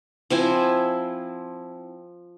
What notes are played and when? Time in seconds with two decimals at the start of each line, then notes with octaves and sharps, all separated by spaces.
0.30 F3 C4 E4 G#5